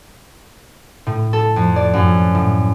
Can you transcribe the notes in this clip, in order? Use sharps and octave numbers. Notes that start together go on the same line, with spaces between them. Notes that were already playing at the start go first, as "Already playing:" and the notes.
A2
A4
F2
D5
F#2
A2